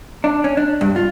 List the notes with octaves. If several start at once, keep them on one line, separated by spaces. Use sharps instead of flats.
D4
C#4
D4
G2
F4